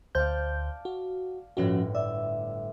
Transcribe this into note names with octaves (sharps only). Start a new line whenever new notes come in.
D2 C5 D5 F5 A5 G6
F#4
G1 A2 F3 C#4 F#4
D5 E5